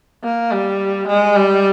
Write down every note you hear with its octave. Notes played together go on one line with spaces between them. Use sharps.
A#3
G3
G#3
G3